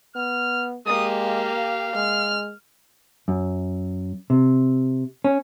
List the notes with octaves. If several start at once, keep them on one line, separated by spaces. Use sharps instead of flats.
B3 F6
G#3 A#3 G4 D#6
F5
G#3 F6
F#2
C3
C#4